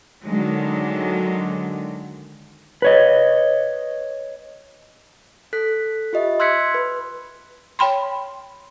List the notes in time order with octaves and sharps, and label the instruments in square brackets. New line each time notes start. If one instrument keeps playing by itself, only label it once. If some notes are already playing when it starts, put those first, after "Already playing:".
[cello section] D3 D#3 F#3 G#3
[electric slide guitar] B4 C#5 D#5
[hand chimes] A4 F#6 B6
F4 G4 D#5 E5
C6 E6 F#6 G#6 B6 C#7
B4
[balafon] C#5 G5 B5 C6